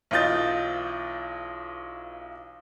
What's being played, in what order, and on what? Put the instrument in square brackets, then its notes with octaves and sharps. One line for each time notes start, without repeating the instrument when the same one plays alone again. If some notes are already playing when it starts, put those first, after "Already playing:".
[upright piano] B1 E3 F4 D#5 G6 A6